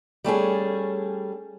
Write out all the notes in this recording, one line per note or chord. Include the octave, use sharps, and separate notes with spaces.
G3 A3 C#4 G#4